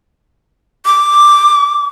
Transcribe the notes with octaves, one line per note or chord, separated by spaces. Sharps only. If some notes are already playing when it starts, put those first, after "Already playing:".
D6